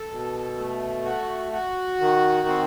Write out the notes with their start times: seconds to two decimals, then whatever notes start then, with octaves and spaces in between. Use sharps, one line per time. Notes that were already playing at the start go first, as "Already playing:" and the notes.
Already playing: A4
0.11 B2
0.58 A3
1.05 F#4
1.52 F#4
2.00 D#3
2.48 C4